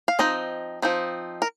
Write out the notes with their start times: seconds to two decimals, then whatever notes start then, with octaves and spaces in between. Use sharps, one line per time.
0.08 F5
0.19 F3 C4 D#4 D#5
0.82 F3 C4 D#4
1.42 A#4